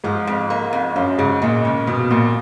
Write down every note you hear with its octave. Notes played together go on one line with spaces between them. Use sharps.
G#2 F3
F2
A#3
F2
F#2 F3
G#2 C#3
A#2 G#3
C#3
B2 F3
F2 A#2